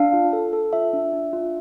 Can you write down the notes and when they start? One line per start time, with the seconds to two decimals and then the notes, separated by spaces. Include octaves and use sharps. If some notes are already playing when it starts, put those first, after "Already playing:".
Already playing: D4 F5
0.13 F4
0.33 A4
0.53 A4
0.73 F4 E5
0.93 D4
1.13 D4
1.33 F4